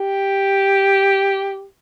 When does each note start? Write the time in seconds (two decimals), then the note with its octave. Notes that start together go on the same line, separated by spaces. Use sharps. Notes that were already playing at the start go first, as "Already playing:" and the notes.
Already playing: G4